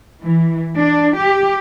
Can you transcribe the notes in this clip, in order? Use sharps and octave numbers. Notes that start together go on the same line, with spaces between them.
E3
D4
G4